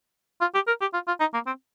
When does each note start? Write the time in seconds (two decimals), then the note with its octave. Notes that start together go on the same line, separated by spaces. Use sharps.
0.41 F4
0.55 G4
0.68 A#4
0.81 G4
0.94 F4
1.08 F4
1.20 D#4
1.34 A#3
1.47 C4